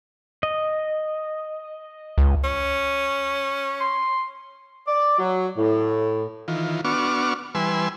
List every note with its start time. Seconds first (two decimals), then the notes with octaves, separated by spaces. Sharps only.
0.43 D#5
2.18 C#2
2.44 C#4
3.80 C6
4.87 D5
5.19 F#3
5.58 A2
6.48 D#3 E3 F4
6.85 B3 D4 F#4 C#6 D6 F6
7.55 E3 G3 B4 G#5 C6 E6